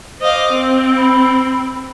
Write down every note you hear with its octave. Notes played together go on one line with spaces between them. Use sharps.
C5 D#5 F5 D6
C4
B5